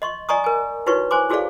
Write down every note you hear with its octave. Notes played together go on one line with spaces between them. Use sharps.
D#5 C6 C#6
D5 D#5 G#5 A#5 C#6 D#6
A#4 G#5
D#4 E4 F#4 B4 C#5 C#6
C5 G#5 C6 D6
E4 F#4 G#4 A4 D5 F5